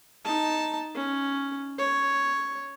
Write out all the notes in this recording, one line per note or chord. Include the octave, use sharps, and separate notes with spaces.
D#4 A5
C#4
C#5